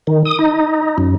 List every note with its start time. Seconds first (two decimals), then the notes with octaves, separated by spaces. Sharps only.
0.07 D#3
0.25 D#6
0.39 D#4
0.98 F#2